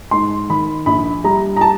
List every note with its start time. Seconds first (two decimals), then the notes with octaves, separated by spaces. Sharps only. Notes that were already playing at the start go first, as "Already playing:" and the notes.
0.11 G#2 C6
0.50 D#3 B5
0.86 A#1 B5
1.24 G3 A#5
1.56 A#5
1.61 A5